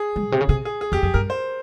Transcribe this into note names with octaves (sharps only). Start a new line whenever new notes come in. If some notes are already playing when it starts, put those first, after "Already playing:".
Already playing: G#4
G#3
A#2
C3
C#3
C3 G#4
G#4
G#4
E2 G4
F2 G#4
G2 A#4
C5